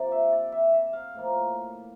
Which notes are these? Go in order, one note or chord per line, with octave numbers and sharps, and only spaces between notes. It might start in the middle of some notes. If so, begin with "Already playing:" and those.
Already playing: C3 F3 A#3 D5
E5
D5
E5
E5
F5
A2 F3 A#3